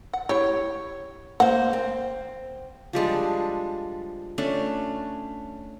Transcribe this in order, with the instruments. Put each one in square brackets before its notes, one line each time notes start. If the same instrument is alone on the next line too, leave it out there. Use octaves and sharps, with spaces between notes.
[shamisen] F#5
[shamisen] E4 G4 [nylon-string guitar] C#5
[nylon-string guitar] A#3 C5 [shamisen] F5 F#5
[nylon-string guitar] C4
[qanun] F3 G3 G#3 D4
A3 C#4 D4